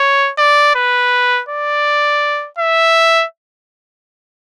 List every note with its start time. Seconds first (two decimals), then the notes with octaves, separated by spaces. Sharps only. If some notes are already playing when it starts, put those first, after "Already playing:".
Already playing: C#5
0.38 D5
0.75 B4
1.49 D5
2.59 E5